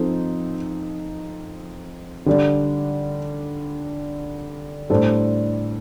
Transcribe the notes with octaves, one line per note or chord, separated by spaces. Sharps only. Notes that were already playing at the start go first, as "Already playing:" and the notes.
Already playing: F3 C4 D#4 A4 C5
D3 G3 D4
A2 G3 D4 A4 C5